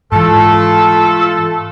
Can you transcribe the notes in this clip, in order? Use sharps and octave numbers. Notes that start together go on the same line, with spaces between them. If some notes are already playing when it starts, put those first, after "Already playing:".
G#2 E3 A3 F4 A4